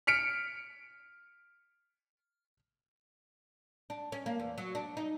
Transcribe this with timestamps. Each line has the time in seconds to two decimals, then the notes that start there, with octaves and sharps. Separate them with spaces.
0.07 F6 B6 C#7 D7
3.90 D4
4.12 C#4
4.26 A#3
4.39 E2
4.58 F#3
4.75 D4
4.97 D#4